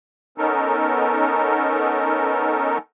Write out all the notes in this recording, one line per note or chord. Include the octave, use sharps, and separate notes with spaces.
B3 C#4 D#4 A4 A#4